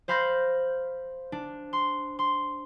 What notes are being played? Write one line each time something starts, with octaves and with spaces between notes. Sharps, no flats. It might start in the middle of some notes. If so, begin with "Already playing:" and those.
C5 F5 B5 C6 G6 A#6
D4
C6
C6